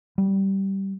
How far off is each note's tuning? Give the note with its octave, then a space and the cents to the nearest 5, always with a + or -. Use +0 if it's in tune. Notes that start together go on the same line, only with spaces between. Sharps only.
G3 -15